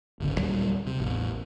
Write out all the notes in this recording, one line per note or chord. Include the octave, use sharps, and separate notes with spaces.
D1 G1 C#3
D#1 C2 F#3 G3
C3
A1 E2